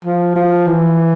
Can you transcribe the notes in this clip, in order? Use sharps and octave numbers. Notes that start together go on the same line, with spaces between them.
F3
F3
E3